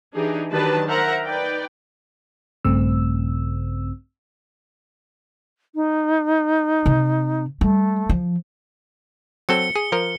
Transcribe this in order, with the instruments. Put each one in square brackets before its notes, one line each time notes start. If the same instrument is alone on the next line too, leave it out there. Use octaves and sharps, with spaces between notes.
[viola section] E3 D4 D#4 G4 G#4
D#3 F#3 D4 G4 B4 A5
A#4 C5 E5 F#5 A#5
D#4 B4 D5 G5
[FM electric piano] A#1 G2 C#3 A3 C4 E6
[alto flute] D#4
[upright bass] C3
[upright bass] G3 [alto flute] A3
[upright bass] F3
[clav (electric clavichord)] F#3 C4 A4 [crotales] C#7 G7
[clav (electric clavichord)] G#4
F3 A#4